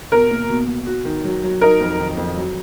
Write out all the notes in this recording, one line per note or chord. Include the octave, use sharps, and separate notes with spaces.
B2 A#4
A#3
B2
B2
F#4
D#3
F#3
F#3
D#4 A#4
F2
D#3
F2
F#3